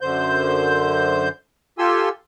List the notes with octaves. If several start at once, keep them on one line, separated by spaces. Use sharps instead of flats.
F#2 D3 C5 G6
F4 G4 A4 G#5 C6 E6